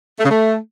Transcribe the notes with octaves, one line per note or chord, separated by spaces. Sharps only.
A3
C#3
A3